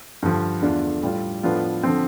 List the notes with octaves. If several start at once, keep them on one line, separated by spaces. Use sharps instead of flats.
G2 D3 F3
E2 D3 A3 D4 F4
A2 G3 D4 F4
A2 F3 B3 D4 F4
D3 F3 C4